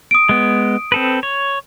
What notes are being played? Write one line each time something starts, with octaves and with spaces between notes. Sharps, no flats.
D#6 D7
G#3 B3
C4 A4 B4
C#5